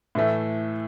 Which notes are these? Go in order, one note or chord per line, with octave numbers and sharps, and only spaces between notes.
A2 E3 A3